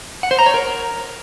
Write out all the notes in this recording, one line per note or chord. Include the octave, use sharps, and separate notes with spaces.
F#5
C5
A#5
C#5
A#4